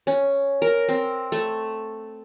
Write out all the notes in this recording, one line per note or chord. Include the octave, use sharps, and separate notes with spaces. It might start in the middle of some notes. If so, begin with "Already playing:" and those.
C#4
A#4
C4
A3